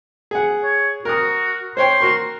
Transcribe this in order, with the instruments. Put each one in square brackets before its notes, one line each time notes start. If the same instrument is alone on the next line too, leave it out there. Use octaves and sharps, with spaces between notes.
[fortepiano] G#4 F#5
[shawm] C#5
[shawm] F#4 [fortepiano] A#4 D#6
[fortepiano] C5 C#5 G5 [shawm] C6
[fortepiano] F#4 A#4 C#6